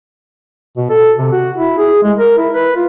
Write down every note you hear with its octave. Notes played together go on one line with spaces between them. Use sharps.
B2
A4
C3
F#4
E4
G#4
G#3
A#4
E4
B4
F4